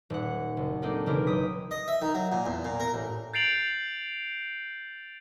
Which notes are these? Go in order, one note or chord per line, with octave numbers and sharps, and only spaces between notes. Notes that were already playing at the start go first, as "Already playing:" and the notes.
D#1 F#5
F#1
A#3 C4 D4 D#4 G4 A4
E1 C#3 C#4 E4 G4 A#4
F#1 F#3 G5 D#6 B6
D#5
E5
D#3
F#3
A#2
E2
A#2
A#4
A1
G6 A6 C7 D7 F7 F#7